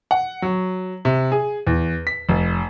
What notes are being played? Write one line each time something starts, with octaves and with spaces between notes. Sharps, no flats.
F#5
F#3
C3
G#4
E2
B6
F1